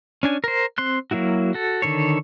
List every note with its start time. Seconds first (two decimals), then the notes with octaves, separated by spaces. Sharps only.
0.23 C#4 D4 G#5
0.44 A#4 C5
0.78 C4 C6 F#6
1.11 F#3 A#3 E4 F#4
1.54 F#4 A4
1.82 D3 D#3 A4 C#5